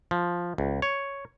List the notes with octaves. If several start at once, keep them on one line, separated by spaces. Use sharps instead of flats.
F3
C#2
C#5